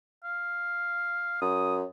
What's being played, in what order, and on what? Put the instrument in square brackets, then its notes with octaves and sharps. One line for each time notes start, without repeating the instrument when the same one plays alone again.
[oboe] F5
[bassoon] F#2 [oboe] D#6